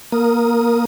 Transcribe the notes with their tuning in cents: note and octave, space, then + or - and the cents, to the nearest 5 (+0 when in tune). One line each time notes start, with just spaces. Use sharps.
A#3 +15 A#4 +0 D#6 +0